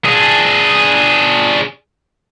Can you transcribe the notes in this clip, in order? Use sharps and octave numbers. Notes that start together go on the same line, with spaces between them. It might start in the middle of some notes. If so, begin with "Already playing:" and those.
D4 G#4